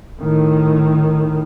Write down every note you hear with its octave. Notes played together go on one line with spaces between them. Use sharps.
A2 D#3